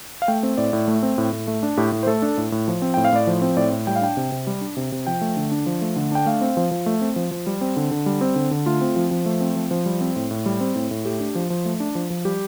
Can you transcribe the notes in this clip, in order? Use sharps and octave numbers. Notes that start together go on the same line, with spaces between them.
F5
A3 G5
C4
A2 D5
A2
A3
C4
A2
A2
A3
D4
A2 G4
A2
C5
A3 A4
D4
A2
A2
F3
C4
A2 G5
F5
A2 D5
F3 C5
C4
A2 D5
A2
G3 G5
F5
D4 G5
C3
C3
G3
D4
C3
C3
F3 G5
A3
D3
D4
F3
A3
D3
D4 G5
A3 F5
C4
F3
F3
A3
C4
F3
F3
G3
C4
D3
D3
G3
C4
D3
D3
A3 F4
C4
F3
F3
A3
C4
F3
F3
G3
C4
A2
A2
G3
C4
A2
A2
A3 G4
D4
F3
F3
A3
D4
F3
F3
G3 G4